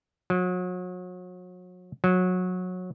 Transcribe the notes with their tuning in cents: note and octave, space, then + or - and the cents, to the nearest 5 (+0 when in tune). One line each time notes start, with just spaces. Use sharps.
F#3 -35
F#3 -20